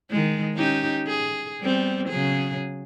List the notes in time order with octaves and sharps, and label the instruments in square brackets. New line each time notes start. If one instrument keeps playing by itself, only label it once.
[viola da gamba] D#3 G#3
C#4 D#4 G4
G#4
G3 B3 C4
C#3 F#3 G#4